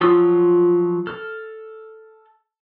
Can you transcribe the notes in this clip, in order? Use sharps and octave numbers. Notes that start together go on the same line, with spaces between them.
F3 F#3 F4 D#6 E6
A4 F6